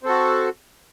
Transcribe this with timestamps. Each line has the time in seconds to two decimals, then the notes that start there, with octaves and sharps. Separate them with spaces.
0.03 C4
0.06 A4
0.09 F#4